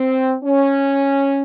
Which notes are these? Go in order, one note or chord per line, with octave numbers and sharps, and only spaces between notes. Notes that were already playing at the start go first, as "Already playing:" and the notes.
Already playing: C4
C#4